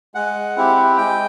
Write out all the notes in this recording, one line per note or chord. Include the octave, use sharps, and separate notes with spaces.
G#3 F#5
C4 E4 G4
G#3 G5